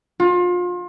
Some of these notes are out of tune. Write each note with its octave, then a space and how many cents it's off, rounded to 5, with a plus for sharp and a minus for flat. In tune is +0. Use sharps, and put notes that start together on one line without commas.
F4 +30